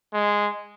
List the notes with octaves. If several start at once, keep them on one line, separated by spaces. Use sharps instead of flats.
G#3